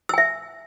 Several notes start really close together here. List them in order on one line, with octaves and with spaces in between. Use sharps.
E6 G#5 E5